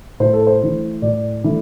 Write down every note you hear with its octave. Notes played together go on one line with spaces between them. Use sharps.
A2 C5
A4
C5
E3 A3
A2 D5
E3 A3